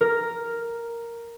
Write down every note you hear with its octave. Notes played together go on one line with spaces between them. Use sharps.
A#4